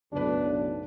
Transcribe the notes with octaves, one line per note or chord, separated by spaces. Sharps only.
F#1 B1 A2 D4 B4